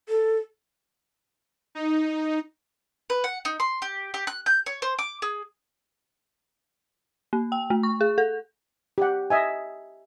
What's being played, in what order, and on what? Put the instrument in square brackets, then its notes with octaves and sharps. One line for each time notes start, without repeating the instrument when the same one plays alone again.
[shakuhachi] A4
[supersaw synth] D#4
[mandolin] B4
F#5
D#4
C6
G4
G4
F#6
G6
C#5
C5
D6
G#4
[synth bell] A#3
G5
A3
C#6
G#4
A4
[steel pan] G4 F#5
D#5 E5 G#5